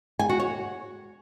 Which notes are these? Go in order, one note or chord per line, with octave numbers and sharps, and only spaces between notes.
G#5
F#4
C#5